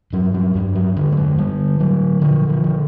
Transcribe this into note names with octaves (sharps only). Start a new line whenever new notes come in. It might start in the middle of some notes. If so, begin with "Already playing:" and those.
G2 F#3
F#3
G2 G3
F#3
D3 G3
A3
G#3
D3 G3
D3 F#3
D3 F3
F3
D3